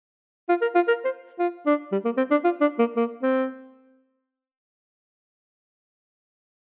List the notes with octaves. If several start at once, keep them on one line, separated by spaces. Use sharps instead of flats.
F4
A#4
F4
A#4
C5
F4
D4
G3
A#3
C4
D4
F4
D4
A#3
A#3
C4